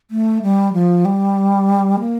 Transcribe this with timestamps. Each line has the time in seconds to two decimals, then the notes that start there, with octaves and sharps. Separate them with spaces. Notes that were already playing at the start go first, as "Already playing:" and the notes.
0.11 A3
0.42 G3
0.73 F3
1.05 G3
2.00 A#3